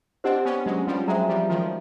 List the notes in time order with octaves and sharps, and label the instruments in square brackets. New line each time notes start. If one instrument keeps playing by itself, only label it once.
[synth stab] C4 D4 [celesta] G4 C5 D#5 F#5
[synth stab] B3 C#4
F#3 G#3
F3 G3
[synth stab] F#3 G#3 [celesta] C5 E5 G5 A#5
[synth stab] F3 G3
D#3 F3